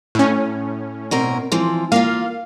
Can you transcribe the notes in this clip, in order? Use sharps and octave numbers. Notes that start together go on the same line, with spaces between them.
A2 C#4
B2 C4 A#4
E3 F3 C4
A#3 F4 F5